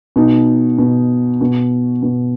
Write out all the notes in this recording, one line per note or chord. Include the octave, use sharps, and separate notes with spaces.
B2 D#4
B2
B2
B2